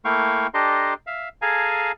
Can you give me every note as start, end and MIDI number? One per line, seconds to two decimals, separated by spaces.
0.05 0.47 57
0.05 0.47 58
0.05 0.47 64
0.05 0.47 77
0.05 0.47 79
0.05 0.47 85
0.54 0.94 62
0.54 0.94 67
0.54 0.94 69
0.54 0.94 75
0.54 0.94 82
0.54 0.94 84
1.07 1.29 76
1.07 1.29 77
1.42 1.92 68
1.42 1.92 69
1.42 1.92 77
1.42 1.92 80
1.42 1.92 82